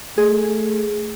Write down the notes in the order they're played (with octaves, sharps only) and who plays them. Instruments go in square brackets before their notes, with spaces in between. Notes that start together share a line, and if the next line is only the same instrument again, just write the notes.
[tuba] A3 [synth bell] G#4